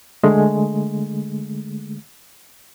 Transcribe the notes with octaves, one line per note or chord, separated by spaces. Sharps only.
D3 G#3 A3